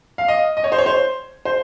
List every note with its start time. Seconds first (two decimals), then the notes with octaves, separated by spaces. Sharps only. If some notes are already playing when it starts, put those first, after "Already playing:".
0.18 F5
0.28 D#5
0.57 D#5
0.64 C#5
0.72 C5
0.78 C#5
0.86 C5
1.45 C5